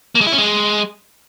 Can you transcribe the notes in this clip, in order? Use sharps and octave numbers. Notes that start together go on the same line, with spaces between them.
A#3
G#3
E4
C#4
G#3